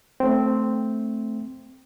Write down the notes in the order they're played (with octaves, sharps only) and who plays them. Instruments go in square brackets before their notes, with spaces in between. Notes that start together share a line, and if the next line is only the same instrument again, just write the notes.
[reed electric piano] A3 C4